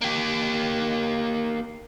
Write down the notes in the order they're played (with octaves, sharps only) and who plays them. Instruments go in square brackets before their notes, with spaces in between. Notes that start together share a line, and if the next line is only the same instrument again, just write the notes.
[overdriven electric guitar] A#3 G4